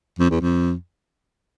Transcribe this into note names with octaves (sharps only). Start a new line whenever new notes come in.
F2
E2
F2